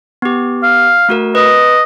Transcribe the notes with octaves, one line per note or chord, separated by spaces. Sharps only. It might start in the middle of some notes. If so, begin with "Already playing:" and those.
B3 G4
F5
A3 F#4 A#4
B4 D#5